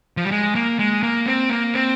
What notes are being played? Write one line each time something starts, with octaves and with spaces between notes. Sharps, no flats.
F3
G3
G#3
A#3
G#3
A#3
C4
A#3
C4